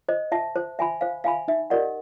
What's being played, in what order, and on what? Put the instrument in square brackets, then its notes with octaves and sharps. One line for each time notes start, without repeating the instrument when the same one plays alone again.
[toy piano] C5 [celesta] D#5
[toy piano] E5 A5
C5
E5 G#5 B5
[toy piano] C5 [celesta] F5
[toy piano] E5 G#5 B5 [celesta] F5
[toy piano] D#4 [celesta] E5
[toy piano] G4 A#4 D#5 F#5 [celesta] D5